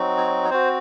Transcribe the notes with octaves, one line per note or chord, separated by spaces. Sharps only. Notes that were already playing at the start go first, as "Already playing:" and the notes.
Already playing: F#3 C4 D#4 F#4
C#5
C#5
C4 F#4 C5